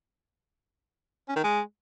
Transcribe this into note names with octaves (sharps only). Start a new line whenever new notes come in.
C#4
D#3
G#3